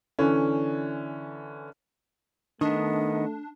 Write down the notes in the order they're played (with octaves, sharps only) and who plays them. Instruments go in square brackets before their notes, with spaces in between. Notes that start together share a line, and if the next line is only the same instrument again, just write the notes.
[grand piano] D3 E3 C#4
[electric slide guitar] D#3 B3 [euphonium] A3 [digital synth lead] D4 [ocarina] D#5